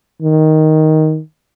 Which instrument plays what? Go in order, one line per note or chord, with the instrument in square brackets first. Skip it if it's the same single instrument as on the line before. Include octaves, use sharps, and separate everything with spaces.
[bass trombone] D#3